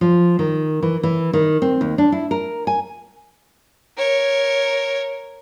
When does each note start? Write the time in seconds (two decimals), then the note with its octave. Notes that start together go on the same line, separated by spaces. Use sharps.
0.01 F3
0.39 D#3
0.82 E3
1.03 E3
1.33 D#3
1.62 C4
1.81 D#2
1.98 D4
2.12 E4
2.31 A#4
2.67 G#5
3.98 A#4 C#5